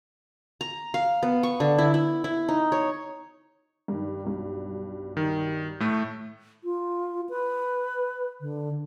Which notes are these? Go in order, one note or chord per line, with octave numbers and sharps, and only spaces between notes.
A#5
F5
B3
C#6
D3
E4
E4
E4
D#4
C#5
G2 D#3
B1 G2
D#3
A2 A3
F4
B4
D3